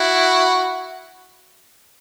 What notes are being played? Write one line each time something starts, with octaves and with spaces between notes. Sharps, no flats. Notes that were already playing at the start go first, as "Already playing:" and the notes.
Already playing: E4 F#4